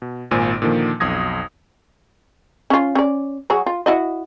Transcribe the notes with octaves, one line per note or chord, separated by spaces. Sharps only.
B2
G#1 A#2 C5 G#5 D7
A#2 D3 D#3 F3 A#3
B1 F2 D#6 G#6 A#6
C#4 F4
C#4 D5
F#3 F#4 G#4
F4
E4 F#4 D#5